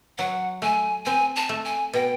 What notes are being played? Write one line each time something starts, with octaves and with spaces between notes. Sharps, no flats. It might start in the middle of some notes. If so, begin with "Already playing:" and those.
F#3 F#5
A3 G#5
C4 G#5
A5
A3
G#5
B2 G5